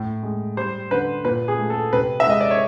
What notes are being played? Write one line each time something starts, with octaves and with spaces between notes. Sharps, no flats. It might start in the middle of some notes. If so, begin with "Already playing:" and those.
Already playing: A2
G#3
G3 C5
D3 B4
A#2 B4
G#4
A3
A4
C3 B4
E5
G#3 D#5
D5
C#5